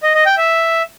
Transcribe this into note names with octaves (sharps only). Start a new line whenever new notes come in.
D#5
D#5
G5
E5